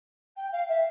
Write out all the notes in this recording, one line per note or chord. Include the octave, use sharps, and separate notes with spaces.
G5
F5
E5